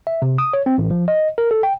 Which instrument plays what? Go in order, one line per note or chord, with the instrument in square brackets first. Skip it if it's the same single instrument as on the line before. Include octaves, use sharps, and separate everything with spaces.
[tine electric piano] E5
C3
D#6
C#5
C4
A1
F3
D#5
A#4
A4
G5